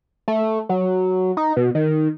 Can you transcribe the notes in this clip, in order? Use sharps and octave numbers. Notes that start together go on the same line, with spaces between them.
A3
F#3
D#4
B2
D#3